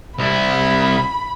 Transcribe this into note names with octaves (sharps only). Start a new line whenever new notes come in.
C2 E4 B5